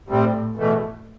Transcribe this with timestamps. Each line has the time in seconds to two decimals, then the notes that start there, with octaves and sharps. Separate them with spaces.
0.08 A2 C3 G3 C4
0.56 E2 B2 A3